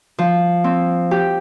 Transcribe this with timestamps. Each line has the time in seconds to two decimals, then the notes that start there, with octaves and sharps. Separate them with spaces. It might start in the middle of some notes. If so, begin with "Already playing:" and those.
0.18 F3
0.64 C4
1.11 G4